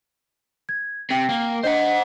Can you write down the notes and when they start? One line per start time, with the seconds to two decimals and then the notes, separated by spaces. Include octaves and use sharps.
0.69 G#6
1.11 C3 G5
1.29 A#3
1.63 D4 C5 D#5 F#5